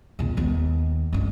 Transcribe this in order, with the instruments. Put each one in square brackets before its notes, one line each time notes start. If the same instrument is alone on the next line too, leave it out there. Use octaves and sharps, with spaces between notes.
[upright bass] E2 A#2
D#2 B3
G1 D4